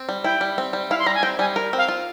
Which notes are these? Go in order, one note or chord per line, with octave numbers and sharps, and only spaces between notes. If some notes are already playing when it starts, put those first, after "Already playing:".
Already playing: C4
G3
E4 G5
G3
C4
G3
E4 F5
C6
G3 A#5
G#5
C4 G5
G3 G#5
A#4
C4 F5
F4